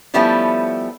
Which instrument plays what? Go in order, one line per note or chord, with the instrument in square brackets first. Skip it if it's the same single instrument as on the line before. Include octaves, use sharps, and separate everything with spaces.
[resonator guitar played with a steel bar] F3 G3 A3 B3 C#4 E4